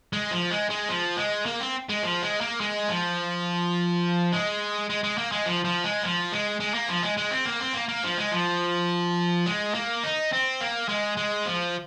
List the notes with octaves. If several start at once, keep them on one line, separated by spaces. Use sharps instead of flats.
G#3
F3
G#3
G#3
F3
G#3
A#3
C4
G#3
F3
G#3
A#3
G#3
F3
G#3
G#3
G#3
A#3
G#3
F3
F3
G#3
F3
G#3
G#3
A#3
F3
G#3
G#3
C4
A#3
C4
A#3
A#3
F3
G#3
F3
G#3
A#3
D#4
C4
A#3
G#3
G#3
F3